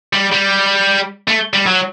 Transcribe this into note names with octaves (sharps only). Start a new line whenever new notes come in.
G3
G3
A3
G3
F#3